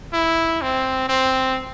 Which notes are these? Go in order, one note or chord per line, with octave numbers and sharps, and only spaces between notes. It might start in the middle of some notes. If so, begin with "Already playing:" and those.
E4
C4
C4